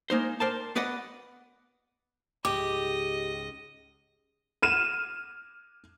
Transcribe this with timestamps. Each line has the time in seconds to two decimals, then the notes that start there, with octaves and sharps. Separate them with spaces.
0.10 G#3 A#3 D#4 C5
0.40 A#4 C5 D5 G5 A5
0.76 B3 B4 D5 D#5 F#5
2.45 C#2 G#2 G4 D#5 D6
4.62 F6 D#7 E7